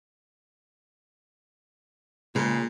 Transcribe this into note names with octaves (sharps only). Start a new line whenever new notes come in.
A#2 C#3 G#3